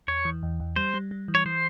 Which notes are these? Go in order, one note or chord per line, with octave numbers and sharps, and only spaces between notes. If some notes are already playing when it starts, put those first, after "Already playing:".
E2 C#5
E3
E2
E2
G3 C5
G3
G3
E3
C#5
E3 C5